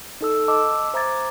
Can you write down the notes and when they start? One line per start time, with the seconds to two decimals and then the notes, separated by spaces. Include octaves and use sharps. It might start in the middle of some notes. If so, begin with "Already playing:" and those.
0.21 D#4 A4 E6
0.48 D#5 A5 D6 E6
0.94 C5 E5 A#5 D6 G#6 A6